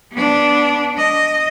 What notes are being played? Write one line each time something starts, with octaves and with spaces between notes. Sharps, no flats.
B3 D4
D#5